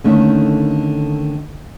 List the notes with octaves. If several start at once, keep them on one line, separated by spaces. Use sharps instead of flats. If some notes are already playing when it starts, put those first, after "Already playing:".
D3 D#3 A3 A#3 C#4 D#4